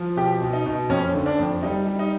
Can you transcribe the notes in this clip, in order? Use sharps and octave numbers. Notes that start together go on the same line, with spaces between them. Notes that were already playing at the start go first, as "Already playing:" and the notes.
Already playing: F3
B2 G4
B2
D#4
B2
F2 C#4
D3
D4
F2
G3 D#4
G3
D#4